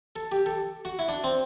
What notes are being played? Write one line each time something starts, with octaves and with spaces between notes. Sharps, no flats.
A4
G4
A4
F#4
E4
D4
C4